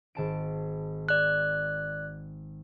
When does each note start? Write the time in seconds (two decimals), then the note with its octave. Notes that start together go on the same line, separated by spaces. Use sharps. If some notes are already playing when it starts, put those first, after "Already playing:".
0.15 G#1 A5 D7
1.09 D5 F#6